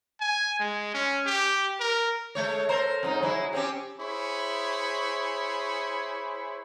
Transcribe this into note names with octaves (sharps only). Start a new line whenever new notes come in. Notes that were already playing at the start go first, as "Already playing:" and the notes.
G#5
G#3
C#4
G4
A#4
G#3 A3 C#5
A4 A#4 C5
F2 G#2 D#4
F#3 G#3 E4
C4 C#4 G4
E4 G#4 C5 C#5 B5 C#6